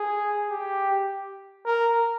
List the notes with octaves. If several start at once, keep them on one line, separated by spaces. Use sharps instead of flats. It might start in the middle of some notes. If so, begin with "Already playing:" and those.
Already playing: G#4
G4
A#4